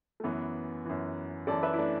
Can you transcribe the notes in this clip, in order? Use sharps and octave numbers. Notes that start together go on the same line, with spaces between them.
A3
F#2 E3 B3
F#2 E3
F#2 E3 A4 D5
B4 E5
E4
A3 D4